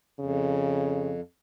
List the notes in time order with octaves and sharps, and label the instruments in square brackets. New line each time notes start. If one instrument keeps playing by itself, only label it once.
[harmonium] F2 [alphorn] C#3